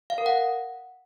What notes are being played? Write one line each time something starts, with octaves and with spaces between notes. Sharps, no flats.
F5
A#4
F#5